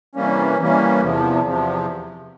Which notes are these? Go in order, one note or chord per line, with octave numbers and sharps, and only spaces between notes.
C3 E3 G3 A#3 C#4
C3 E3 G3 A#3 C#4
E2 C3 F3
E2 C3 F3